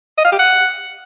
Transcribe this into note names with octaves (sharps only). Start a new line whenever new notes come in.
D#5
F5
G4
F#5